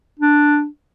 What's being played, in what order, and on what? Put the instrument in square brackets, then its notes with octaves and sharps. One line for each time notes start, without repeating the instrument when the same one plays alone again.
[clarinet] D4